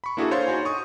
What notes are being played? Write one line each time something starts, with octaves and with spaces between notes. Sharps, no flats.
B5 C#6
A#3 D4 E4 F#4 G#4 A4
C5 C#5 F5 C6 G6 A6
D#4 F#4 C#5 G#5
C#6 D#6